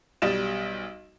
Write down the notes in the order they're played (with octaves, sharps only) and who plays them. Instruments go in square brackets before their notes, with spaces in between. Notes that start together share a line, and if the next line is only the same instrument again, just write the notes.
[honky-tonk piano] B1 G3 D#5 A6 E7